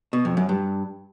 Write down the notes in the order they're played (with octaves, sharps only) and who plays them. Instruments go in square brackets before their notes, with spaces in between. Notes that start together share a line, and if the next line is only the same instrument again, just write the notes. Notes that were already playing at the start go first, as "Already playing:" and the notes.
[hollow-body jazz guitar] B2
F2
F#2
G2